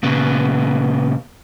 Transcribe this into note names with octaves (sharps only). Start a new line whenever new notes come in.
A#2 C#3 B3